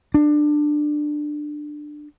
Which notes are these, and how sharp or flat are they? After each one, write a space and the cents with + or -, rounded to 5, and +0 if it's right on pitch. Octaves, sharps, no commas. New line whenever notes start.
D4 +20